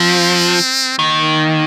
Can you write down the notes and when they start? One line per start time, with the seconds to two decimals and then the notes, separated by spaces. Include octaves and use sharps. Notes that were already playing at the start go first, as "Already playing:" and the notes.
Already playing: F3 C4
0.99 D#3 A#3